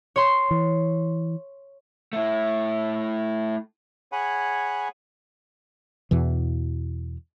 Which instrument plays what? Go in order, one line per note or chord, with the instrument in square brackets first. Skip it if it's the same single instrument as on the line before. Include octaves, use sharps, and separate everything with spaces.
[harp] C#5 C6
[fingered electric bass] E3
[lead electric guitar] A3 E4
[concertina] G#4 C#5 F#5 G#5 B5
[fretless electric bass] E2 B2 E3